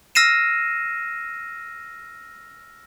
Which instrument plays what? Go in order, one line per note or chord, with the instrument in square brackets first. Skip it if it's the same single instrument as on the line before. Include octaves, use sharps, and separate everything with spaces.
[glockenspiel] E6 F6 A#6 C7 D#7 E7